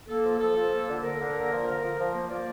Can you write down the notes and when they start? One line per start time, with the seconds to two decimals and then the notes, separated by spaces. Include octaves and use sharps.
0.08 A#3 A4
0.24 F3
0.39 F3 A4
0.56 F3
0.72 A#3
0.88 D3
1.03 D3 A#4
1.19 D3
1.34 A#3
1.51 F3
1.66 D3
1.82 F3
1.98 F3
2.14 A#3
2.29 F3 D5